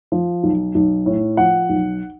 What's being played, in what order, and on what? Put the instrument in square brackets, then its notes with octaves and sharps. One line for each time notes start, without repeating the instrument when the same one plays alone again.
[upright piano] F3
B1
B1
A2
F3 F#5
B1